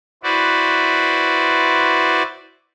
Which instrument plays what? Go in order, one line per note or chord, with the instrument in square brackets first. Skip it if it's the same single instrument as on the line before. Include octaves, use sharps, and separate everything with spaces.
[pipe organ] E4 F#4 B4 C5 D5